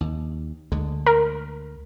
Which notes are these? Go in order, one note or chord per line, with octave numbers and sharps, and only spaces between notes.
D#2
D2 D3 G#3
A#4